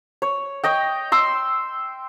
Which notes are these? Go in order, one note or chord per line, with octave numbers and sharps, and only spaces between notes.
C#5
C#5 D#5 G5
C6 E6